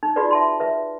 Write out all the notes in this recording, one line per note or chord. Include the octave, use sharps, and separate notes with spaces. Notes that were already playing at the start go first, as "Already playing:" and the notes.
D#4
D#4 F4 F#4 G#4 B4 D5
E5 A5 C6
B4 E5